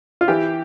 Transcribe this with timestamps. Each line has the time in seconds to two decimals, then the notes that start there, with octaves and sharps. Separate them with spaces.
0.21 F4
0.28 E3 G4